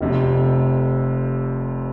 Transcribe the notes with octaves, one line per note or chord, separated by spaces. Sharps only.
F1 F2 C3